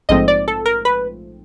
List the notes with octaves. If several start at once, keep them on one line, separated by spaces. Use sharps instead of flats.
A#1 G#2 F3 A3 C4 D#5
D5
A4
A#4
B4